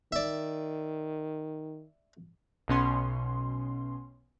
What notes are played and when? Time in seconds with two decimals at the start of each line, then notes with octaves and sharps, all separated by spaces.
0.12 D#3 D5 E5
2.68 B1 B2 C#4 C6